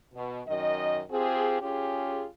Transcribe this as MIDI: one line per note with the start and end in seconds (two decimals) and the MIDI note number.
0.14 0.41 47
0.47 1.03 42
0.47 1.03 51
0.47 1.03 75
1.11 1.59 60
1.11 1.59 65
1.11 1.59 67
1.11 1.59 68
1.62 2.26 61
1.62 2.26 65
1.62 2.26 67
1.62 2.26 68